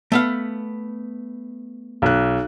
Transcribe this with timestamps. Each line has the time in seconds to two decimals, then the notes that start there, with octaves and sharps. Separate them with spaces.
0.12 A3 B3 F5
2.02 B1 F#6